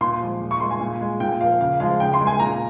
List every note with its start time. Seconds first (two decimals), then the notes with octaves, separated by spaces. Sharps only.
0.01 A#2 C6
0.21 F3 G#3
0.41 A#2
0.51 C#6
0.60 G#3 C6
0.71 G#5
0.81 A#2
1.01 G#3
1.20 A#2 G5
1.40 F3 A#3 F5
1.61 C#3 F5
1.80 F3 G#3 F5
2.00 C#3 G5
2.14 C6
2.20 G#3
2.27 G#5
2.40 A#2 A#5